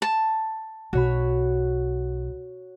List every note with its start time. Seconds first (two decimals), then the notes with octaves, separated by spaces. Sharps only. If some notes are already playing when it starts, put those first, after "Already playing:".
0.02 A5
0.93 B1 F#4 C#5 B5